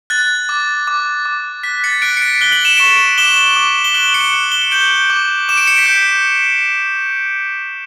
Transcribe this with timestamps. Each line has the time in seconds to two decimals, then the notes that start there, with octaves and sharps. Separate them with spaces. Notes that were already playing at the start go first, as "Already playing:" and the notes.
0.10 F#6 A6
0.49 D6
0.87 D6
1.25 D6
1.63 F#6 B6
1.84 A6 C#7
2.02 F#6 B6 D7
2.17 C#7
2.22 B6 D7
2.41 F#6 G7
2.52 F#7
2.65 E7
2.77 C#6 D7 F#7
3.18 D6 E7 G7
3.56 D6
3.84 G7
3.94 F#6 D7 F#7
4.14 C#7 E7
4.33 F#6
4.52 E7 G7
4.62 G7
4.71 G6 D7 F#7
5.10 D6
5.49 D6 E7
5.57 D7
5.67 C#7
5.77 B6 D7
5.86 G6